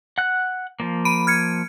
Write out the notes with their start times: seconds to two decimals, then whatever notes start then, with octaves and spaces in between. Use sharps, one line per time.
0.18 F#5 F#6
0.80 F3 A#3
1.05 B5 D7 D#7
1.27 F6 G#6 C#7